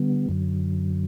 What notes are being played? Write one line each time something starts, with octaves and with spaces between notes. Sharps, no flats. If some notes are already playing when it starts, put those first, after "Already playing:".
Already playing: D3 G3 B3
F#2 D3 F#3